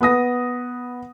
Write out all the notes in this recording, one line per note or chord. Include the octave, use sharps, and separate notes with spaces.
B3 B4 D#6 A#6